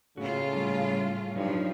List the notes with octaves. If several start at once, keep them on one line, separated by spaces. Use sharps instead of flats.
A2 C#3 C#4 F4 F#4
G3 C#4 A5
G2 F3 F#3 D#4 C#5